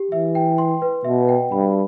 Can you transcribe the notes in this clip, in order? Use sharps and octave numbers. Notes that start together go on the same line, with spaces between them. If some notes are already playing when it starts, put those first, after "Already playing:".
Already playing: G4
E3 E5
G5
C6
B4
B2 E5
G5
G2 B5